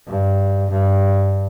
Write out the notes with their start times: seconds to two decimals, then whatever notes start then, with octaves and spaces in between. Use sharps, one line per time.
0.08 G2
0.72 G2